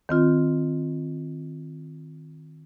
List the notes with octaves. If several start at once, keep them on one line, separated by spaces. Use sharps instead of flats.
D#3 C4 F4